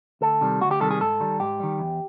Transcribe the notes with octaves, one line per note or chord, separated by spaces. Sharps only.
D2 A4
C3 D#3 G3
D2 F#4
G4
C3 D#3 G3 A4
G#4
G#2 A4
D#3 G3
G#2 G4
D#3 G3
E2